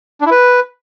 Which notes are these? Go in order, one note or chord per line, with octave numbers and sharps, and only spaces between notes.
D4
E4
B4